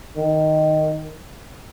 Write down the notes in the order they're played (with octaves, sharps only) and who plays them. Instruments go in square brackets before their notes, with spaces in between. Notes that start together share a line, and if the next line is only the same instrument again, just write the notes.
[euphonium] D#3